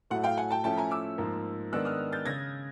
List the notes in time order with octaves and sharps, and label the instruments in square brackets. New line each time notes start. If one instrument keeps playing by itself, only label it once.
[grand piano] A2 F#3 A3 [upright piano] F#5
[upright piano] F5 G5
F#5 G#5
G5 A5
[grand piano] F3 A3 C#4 E4 [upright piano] G5 A5
[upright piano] G#5 A#5
D6 E6
[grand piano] G#2 F3 A#3
[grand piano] D#3 G#3 B3 D4 [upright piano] E6 F#6
[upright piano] D#6 F6
G6 A6
[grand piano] C#3 [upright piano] G#6 A#6